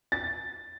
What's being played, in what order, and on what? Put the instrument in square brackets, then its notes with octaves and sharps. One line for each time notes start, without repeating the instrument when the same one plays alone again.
[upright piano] A6